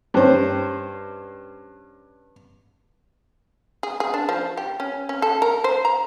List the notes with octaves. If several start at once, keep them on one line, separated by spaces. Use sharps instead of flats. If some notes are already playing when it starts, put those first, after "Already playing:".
G2 C#4 C5
G#4
G#4
D4
F3
G4
C#4
C#4
A4
A#4
C5
A#5